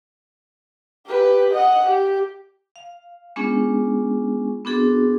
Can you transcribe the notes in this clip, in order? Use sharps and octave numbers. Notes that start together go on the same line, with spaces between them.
G4 B4
D#5 F#5
G4
F5
G#3 B3 C#4 D4 F4 G#4
B3 C4 D4 F#4 G#4 A4